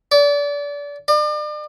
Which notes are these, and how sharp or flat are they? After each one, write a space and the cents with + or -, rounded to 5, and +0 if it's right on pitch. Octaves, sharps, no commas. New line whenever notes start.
D5 -30
D5 +40